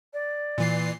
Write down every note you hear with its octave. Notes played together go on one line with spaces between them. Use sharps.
D5
A#2 E3 C7